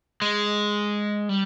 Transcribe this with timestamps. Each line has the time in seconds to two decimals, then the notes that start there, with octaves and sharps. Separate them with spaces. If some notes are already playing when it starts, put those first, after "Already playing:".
0.22 G#3
1.29 G3